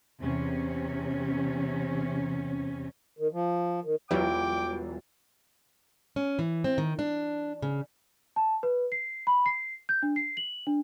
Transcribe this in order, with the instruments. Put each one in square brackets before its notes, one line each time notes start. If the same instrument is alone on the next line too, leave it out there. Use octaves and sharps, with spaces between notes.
[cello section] E2 C3 C#4
[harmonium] D#3
F3
D#3
[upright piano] E1 E4 F4 [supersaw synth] E3 F#3 G3 [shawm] G5 [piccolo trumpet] D6
[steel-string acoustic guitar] C#4
E3
C4
D#3
D4
C#3
[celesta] A5
B4
C7
B5
C7
G6
D4
C7
F#7
D4